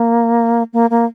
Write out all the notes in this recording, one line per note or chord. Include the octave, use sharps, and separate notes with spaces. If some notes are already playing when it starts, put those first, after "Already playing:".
Already playing: A#3
A#3
A#3